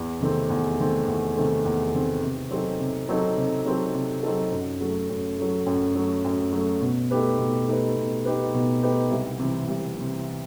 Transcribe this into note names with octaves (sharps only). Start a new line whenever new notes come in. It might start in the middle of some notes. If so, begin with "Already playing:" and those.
Already playing: E2
C3 D#3 A3 C4
E2
C3 D#3 A3 C4
E2
C3 D#3 A3 C4
E2
C3 D#3 A3 C4
C3
F#3 C4 D#4 A4
C3
F#3 C4 D#4 A4
C3
F#3 C4 D#4 A4
C3
F#3 C4 D#4 A4
F#2
F#3 A3
F#2
F#3 A3
F#2
F#3 A3
F#2
F#3 A3
B2
A3 D#4 G4 B4
B2
A3 D#4 G4 B4
B2
A3 D#4 G4 B4
B2
A3 D#4 G4 B4
C2
C3 E3
C2
C3 E3